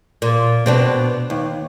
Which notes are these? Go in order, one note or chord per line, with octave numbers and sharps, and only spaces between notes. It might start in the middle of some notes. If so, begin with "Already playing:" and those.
A#2
B2 C4 D4
D#2